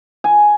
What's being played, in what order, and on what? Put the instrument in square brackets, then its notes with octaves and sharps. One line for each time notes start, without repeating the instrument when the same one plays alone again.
[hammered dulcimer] G#5